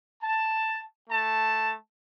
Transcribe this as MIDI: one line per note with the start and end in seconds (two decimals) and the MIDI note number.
0.22 0.82 81
1.09 1.74 57
1.09 1.74 81